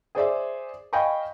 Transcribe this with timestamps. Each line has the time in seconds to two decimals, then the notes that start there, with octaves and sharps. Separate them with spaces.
0.15 G#4 C5 D5 E5
0.93 D#5 F5 G5 G#5 B5 C#6